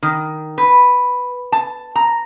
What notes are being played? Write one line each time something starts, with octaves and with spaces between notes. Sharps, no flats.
D#3
B4
A5
A#5